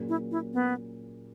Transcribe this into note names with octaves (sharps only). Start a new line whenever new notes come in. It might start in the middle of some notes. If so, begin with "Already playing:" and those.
Already playing: A#2 F#3 A#3 C#4 G#4
E4
E4
B3